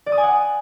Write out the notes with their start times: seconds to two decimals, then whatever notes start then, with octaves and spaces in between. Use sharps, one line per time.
0.06 D5
0.12 D#6
0.18 G#5
0.23 F#5